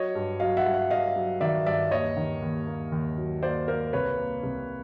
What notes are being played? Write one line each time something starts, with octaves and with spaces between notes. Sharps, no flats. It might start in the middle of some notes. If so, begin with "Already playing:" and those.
Already playing: F#3 C#5 D#5
G2
F#3 D#5 F5
E5 F#5
G2
E5 F#5
G2 D#5 F5
F#3
D#3 D5 E5
G2 D5 E5
D#2 C#5 D#5
D#3
D#2
A#3
D#2
F#3
A#3 C5 D5
A#3 A#4 C5
C2 B4 C#5
A#3
C2